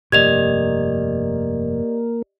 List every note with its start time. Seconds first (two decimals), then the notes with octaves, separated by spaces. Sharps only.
0.12 F1 G2 A#3 G4 D5 D#5 G#6 F7